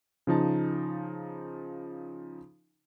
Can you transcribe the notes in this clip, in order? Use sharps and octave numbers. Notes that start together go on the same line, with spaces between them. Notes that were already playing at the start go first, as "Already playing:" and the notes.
C#3 F3 D#4 A5